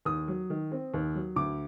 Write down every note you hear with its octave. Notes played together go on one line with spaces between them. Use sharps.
D#2 D#6
F#3
D#3
C4
D#2
F#3
D2 D6